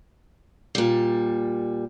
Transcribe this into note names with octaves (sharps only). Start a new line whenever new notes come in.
A#2 G3